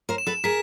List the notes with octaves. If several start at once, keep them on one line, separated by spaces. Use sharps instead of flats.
A#4 C5
E7
A4 B4
G#4 A#4 B6